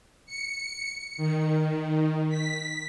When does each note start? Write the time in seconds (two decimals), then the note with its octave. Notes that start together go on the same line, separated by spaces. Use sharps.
0.26 C#7
1.17 D#3
2.29 B6